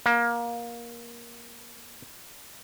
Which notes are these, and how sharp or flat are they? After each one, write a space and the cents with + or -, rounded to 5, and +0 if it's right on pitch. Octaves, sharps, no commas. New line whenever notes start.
A#3 +20